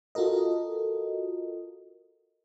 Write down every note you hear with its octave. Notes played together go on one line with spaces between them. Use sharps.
F4 F#4 A4 A#4 D#5